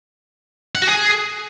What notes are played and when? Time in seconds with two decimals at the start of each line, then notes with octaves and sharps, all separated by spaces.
0.75 F#5
0.82 F#4
0.89 G#4